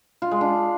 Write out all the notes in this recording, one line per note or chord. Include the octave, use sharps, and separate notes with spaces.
F4
G#3
D4